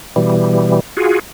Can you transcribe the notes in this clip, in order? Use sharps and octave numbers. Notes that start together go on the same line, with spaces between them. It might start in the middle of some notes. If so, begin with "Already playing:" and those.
B2 E3 G3
F4 F#4 G#4